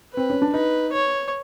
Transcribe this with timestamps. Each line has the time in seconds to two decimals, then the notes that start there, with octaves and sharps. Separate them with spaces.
0.13 C4 B4
0.30 C#4
0.42 D4
0.53 D#4 B4
0.93 C#5